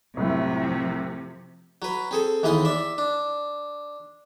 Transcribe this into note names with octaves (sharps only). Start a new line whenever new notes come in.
C2 F#2 A2 C3 F3
F#3 B4
C4 G#4 A4
D#2 E3 G#3 B3 D#5 C6
D5 E5
D4